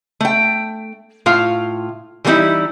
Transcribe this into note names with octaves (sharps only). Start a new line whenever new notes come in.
A3 G5
A2 F4 F5
E3 G3 G#3 A#3 D#4 E4